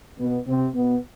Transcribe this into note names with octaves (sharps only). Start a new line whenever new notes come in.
B2 B3
C3 C4
B2 B3